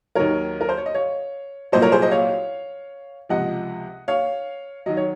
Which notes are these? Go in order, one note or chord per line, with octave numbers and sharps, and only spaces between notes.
D#2 D#3 F#3 A#4 C#5
A#4
C5
C#5
D#5
C#5 F5
C2 A#2 F#3 C5 D#5
A#4 C#5
G#4 C5
C5 D#5
C#5 F5
C#2 C3 F3 D#5 F#5
C#5 F5
D#3 F#3 D#5
C#5